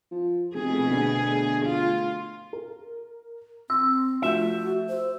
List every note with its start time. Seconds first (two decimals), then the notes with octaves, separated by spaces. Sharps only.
0.11 F3
0.55 F1 B2 A3 G#4
0.90 D2
1.66 F4
2.53 A#4
3.70 C4 C6 E6
4.22 F3 A3 F#4 E5 G6
4.89 C5